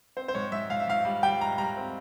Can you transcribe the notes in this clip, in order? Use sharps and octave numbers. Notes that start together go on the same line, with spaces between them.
C4 C5
C5
G#2 C#5
G#2 E5
G#2 F5
E5
G#2 F5
G3
G3 G5
G#2 A#5
G3 A#5
C4